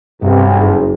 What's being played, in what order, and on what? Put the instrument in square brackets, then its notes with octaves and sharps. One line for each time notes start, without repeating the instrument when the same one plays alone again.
[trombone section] B1 [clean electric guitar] G2 [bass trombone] C3
[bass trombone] F#1